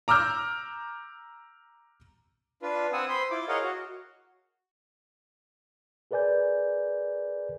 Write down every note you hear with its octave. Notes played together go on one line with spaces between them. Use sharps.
A#5 D6 E6 F6 G6
D4 F4 B4
C4 F#5 G#5 D#6 E6
C5 B5 C6
E4 F4 D6
G#4 A#4 C#5 D#5 F5 F#5
F#4
G#4 A#4 B4 D5 G#5 G6